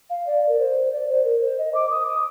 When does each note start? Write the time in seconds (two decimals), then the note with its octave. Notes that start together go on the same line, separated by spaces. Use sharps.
0.10 F5
0.27 D5
0.49 A#4
0.59 C5
0.92 D5
1.09 C5
1.25 A#4
1.42 C5
1.58 D#5
1.75 D6
1.91 D#6
2.07 D#6